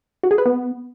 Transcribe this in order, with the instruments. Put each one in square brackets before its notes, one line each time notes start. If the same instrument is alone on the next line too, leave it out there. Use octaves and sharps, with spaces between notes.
[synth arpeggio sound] F#4
G#4
B4
B3